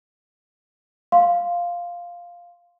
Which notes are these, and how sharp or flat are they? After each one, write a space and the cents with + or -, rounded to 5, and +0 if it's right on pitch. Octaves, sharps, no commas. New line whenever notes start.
F5 +0 C6 +0